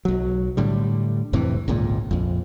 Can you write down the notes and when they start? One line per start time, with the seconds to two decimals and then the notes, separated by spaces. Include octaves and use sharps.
0.05 B1 F#3
0.57 A2 D3 G3
1.33 F2 A2 C3 E3
1.68 G#1 C#2 A#2
2.11 A#1 F2